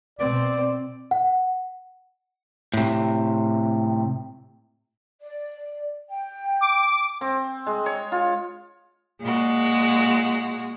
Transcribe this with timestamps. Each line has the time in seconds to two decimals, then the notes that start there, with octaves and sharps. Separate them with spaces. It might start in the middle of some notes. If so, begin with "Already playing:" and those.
0.19 B2 C4 D5
1.11 F#5
2.74 A2 C3
5.19 D5
6.09 G5
6.61 D6
7.21 C4
7.67 G#3
7.86 C#5
8.12 F4
9.21 A#2 G#3 F#4